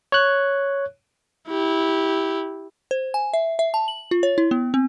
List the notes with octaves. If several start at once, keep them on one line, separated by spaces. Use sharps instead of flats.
C#5 F#6
E4 G4
C5
G#5
E5
E5
A5
F#7
F4
C#5
E4
B3
C4